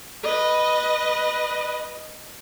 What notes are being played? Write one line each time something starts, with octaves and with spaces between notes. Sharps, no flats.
B4 D#5